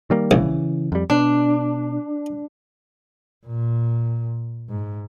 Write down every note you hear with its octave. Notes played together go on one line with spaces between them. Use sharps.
D#3 G3 A#3
A#1 C#3 E3
F2 G3
B2 D4
A#2
G#2